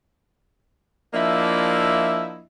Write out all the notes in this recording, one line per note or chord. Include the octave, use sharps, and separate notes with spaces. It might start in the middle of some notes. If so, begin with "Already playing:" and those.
F3 A#3 D4 E4 D#5 E5